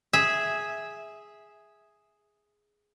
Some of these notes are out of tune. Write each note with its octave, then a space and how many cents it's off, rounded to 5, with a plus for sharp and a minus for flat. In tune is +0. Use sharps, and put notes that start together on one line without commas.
G#4 +0 E5 -10